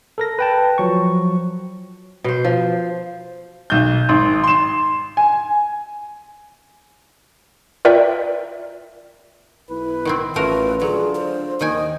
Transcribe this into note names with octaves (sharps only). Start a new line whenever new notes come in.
A4 A#4 A#6
B4 G5 A5
F3 F#3 C#6
B2 C5
F3
B1 G6
G#1 C6
C6 E7
G#5
F4 A#4 B4 D5 E5 G5
B1 E4 B4
D#3 B3 C4
A1 A3 F4 F#4 A#4 B4
D3 F#3 F4 G#4
C5
D#2 D#3 D#5 G5 G#5